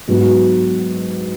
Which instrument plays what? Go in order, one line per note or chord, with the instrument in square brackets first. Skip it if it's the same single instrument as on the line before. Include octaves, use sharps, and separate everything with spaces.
[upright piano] G#2 F#3 B3 F#4